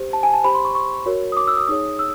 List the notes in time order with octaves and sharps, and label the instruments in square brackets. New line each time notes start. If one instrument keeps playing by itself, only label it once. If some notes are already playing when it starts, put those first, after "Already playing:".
Already playing: [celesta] G4 C5
A5
G#5
A5
G4 C5 B5
C6
C#6
C#6
F#4 A#4 C#5
D#6
D6
E6
D#6
D#4 G#4 C#5 D#6
E6